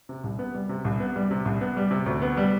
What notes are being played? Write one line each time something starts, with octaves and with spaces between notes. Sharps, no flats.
C3
C2
B3
G3
C3
C2
B3
G3
C3
C2
B3
G3
C3
D2
B3
G3